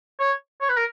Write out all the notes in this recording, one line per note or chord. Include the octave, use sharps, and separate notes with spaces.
C#5
C#5
B4
A#4